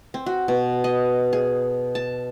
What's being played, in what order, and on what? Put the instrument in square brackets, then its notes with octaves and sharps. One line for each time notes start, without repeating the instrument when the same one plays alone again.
[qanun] C4
F#4
B2
D#5
G#4
A5